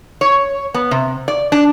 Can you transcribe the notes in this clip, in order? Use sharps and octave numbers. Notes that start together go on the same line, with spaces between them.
C#5
B3
C3
D5
D4